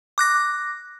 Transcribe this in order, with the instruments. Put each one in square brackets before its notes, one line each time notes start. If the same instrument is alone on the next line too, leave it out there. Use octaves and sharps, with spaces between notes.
[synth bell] D6 F#6 A#6